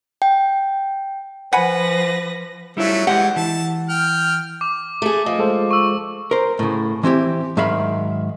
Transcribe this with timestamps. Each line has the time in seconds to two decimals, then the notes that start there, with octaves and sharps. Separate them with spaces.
0.22 G5
1.53 F3 B4 C5 F#5 G#5 B5 A#6
2.77 F#3 G3 A3 C#4 E4 F4
3.07 E3 G#3 G4 F#5
3.36 E3 A5
3.89 G5 F6
4.61 D6
5.02 A3 G#4
5.26 F3 D#5
5.39 G#3 A4 C5
5.71 C#6 E6
6.31 A#4 C5
6.59 A2 C#3
7.03 E3 C4 E4 G4
7.57 G#2 D#3 F#3 E5 F5 B5